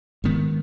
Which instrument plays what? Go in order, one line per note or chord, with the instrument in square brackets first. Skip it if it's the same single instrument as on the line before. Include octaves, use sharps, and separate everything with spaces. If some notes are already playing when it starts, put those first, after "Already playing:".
[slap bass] G#2 D#3 B3